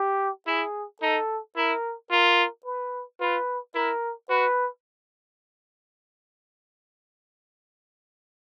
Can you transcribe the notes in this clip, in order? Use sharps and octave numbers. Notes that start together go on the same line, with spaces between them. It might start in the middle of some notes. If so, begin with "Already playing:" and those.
Already playing: G4
E4 G#4
D#4 A4
E4 A#4
F4 A#4
B4
F4 B4
E4 A#4
F#4 B4